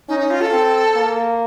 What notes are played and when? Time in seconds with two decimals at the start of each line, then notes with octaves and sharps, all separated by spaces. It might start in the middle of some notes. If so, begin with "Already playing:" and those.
0.09 C#4 D#4
0.20 D#4
0.30 F4
0.41 A4
0.52 C4
0.96 A#3